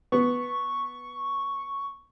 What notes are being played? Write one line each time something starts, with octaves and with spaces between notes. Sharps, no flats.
B3 C#6